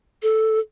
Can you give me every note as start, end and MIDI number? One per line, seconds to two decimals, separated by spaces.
0.23 0.59 69